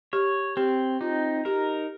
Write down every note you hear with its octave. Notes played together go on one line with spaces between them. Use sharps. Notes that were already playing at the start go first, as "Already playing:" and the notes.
G4 C#5
C4 G4
D#4 F4
G4 A#4